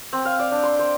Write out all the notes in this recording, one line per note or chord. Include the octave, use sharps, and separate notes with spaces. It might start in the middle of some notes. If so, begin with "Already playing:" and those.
C4
F5
D5
D4
C6
C5